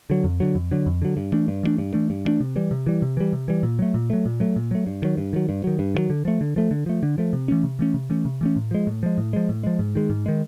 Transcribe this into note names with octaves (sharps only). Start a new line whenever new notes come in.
D3 F#3
F2
D3 F#3
F2
D3 F#3
F2
D3 F#3
G2
E3 A3 D4
G2
E3 A3 D4
G2
E3 A3 D4
G2
E3 A3 D4
C3
E3 G3
C3
E3 G3
C3
E3 G3
C3
E3 G3
A#2
F#3 A3
A#2
F#3 A3
A#2
F#3 A3
A#2
F#3 A3
G2
D#3 F#3
G2
D#3 F#3
G2
D#3 F#3
G2
D#3 F#3
D3
F3 A3
D3
F3 A3
D3
F3 A3
D3
F3 A3
C3
E3 A3 C#4
C3
E3 A3 C#4
C3
E3 A3 C#4
C3
E3 A3 C#4
A2
F3 G#3
A2
F3 G#3
A2
F3 G#3
A2
F3 G#3
G#2
D#3 G#3
G#2
D#3 G#3